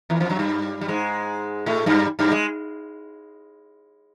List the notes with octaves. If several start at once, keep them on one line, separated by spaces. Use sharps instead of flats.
E2 E3
F2 F3
F#2 F#3
G2 G3
G3
G#2 G#3
A2 A3
G2 G3
G2 G3
G#3